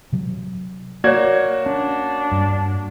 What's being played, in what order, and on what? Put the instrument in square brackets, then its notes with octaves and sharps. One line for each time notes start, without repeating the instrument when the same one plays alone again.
[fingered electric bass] C3 F#3
[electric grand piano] A#3 F#4 G#6 [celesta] C#5 D5
[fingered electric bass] C#4 [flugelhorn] D4
[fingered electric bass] G2